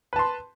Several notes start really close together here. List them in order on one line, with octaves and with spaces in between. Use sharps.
B4 A5 C6